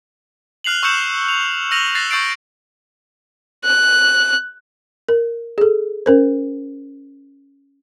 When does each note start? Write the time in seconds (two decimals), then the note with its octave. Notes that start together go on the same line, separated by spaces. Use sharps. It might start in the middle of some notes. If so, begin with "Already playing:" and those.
0.64 F6 F#6 C7 F7 F#7
0.83 C#6 E6 F#6 G6 C#7 E7
1.28 F7
1.71 E6 F6 A#6 D#7 F7 F#7
1.95 F#6 A6 A#6 C7 E7
2.11 C#6 E6 G6 A6 C7 D7
3.65 F#6
5.09 A#4
5.58 G#4 A4
6.06 C#4 A#4 C5